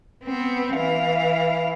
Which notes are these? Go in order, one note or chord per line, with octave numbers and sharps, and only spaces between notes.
B3 C4
E3 F5